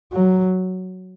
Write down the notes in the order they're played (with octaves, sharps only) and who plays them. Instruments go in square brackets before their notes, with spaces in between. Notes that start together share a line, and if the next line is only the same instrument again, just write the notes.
[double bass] F#3